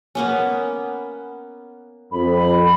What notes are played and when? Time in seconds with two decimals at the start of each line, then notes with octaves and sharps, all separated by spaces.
0.15 A#3 B3 C#4
2.12 F2 B5